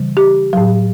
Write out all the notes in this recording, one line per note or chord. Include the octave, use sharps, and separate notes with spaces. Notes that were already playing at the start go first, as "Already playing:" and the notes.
Already playing: C#3 E3 G3
G4
A2 F#3